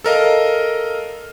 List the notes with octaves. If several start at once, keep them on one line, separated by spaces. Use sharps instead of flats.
A4 A#4 D#5 F5